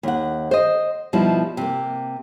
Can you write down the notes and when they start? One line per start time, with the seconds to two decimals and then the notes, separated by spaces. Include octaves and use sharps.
0.03 D#2 F#5
0.51 C5 D#5
1.13 B2 F3 G3 D#4 E4
1.57 C3 A#3